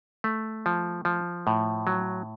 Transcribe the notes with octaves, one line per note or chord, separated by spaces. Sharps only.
A3
F3
F3
A2
F#3